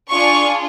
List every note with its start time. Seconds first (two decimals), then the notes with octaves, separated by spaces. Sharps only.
0.11 D4 F4 G#4 C#6